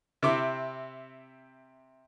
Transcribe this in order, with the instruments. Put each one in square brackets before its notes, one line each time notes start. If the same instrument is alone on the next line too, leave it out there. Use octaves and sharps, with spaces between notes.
[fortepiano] C3 C4 E4 D6